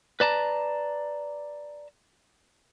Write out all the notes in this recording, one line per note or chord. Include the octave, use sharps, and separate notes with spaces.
B4 D5 A5 A#5